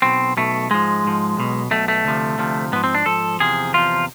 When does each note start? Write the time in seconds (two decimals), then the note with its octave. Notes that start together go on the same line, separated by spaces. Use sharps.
0.02 B1 B2 C4
0.37 B1 B2 A3
0.70 G#2 F3 G#3
1.04 G#2 F3
1.37 B1 B2
1.71 B1 B2 A3
1.88 A3
2.05 D2 C3 F3
2.38 D2 C3 F3
2.72 G#2 F3 B3
2.84 C4
2.95 D4
3.06 G#2 F3 A4
3.40 E2 C3 F3 G#4
3.73 E2 C3 F3 F4